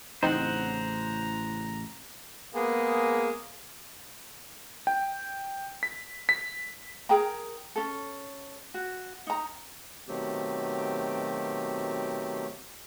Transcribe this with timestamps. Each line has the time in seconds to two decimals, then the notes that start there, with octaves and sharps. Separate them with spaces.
0.23 A1 A2 C#3 C4 D#4 C5 F#5 A#5
2.54 G#3 A#3 B3 G#4
4.87 G5
5.83 B6
6.29 B6
7.09 G#4 A#4 G5 A#5
7.76 C#4 A4
8.74 F#4
9.27 D#4 A#5
10.07 B2 D#3 F#3 A3 C4 G4